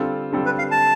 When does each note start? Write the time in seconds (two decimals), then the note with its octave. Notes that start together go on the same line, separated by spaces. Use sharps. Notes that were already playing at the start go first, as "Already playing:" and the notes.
Already playing: D3 G3 C4 F4 A4
0.32 D3 G3 C4 F4 A4
0.46 B4
0.58 F5
0.71 A5